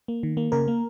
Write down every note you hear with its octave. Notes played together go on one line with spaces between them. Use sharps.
A#3
D#3
A#3
C#3 A#4
A#3